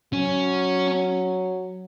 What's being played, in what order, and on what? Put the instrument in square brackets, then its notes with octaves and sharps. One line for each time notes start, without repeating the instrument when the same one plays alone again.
[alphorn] F#3 [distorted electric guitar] C#4